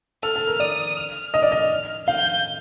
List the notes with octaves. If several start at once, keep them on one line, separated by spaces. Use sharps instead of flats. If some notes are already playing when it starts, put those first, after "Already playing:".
A4 F6
A4
A#4
D5 D#6
F6
D#5
D5
D#5
F5 G6